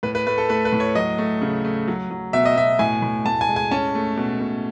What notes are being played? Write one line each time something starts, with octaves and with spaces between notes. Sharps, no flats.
A2 B4
B4
A3 B4
A4
A3 B4
B4
A2
C#5
F#3 D#5
A3
C#3
A3
F#3
F#3
B2 E5
D#5
B2 E5
A2 G#5
A2
A2 A5
G#5
G#3
G#5
C#4 A5
A3
B2
B2